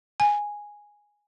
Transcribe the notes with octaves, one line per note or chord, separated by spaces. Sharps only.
G#5